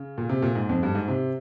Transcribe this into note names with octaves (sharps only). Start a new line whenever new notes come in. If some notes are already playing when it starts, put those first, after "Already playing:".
Already playing: C#3
A#2
C3
A#2
G#2
F2
G2
G#2
C3